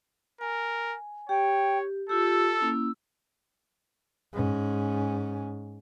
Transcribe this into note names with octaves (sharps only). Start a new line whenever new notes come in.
A#4 G#5
G4 C#5 G5
F4 G4 A4 E6
A#3 C#4 E4
G#2 C#4